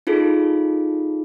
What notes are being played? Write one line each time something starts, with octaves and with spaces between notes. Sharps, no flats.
D#4 F4 G#4 A4